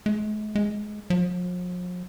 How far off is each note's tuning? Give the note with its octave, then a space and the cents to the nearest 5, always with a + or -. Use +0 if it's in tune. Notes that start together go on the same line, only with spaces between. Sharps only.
G#3 +45
G#3 +15
F3 +45